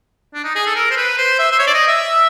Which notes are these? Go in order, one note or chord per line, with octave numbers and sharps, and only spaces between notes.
D4
D#4
G#4
A4
A#4
C5
B4
C5
E5
C5
C#5
D5
D#5
E5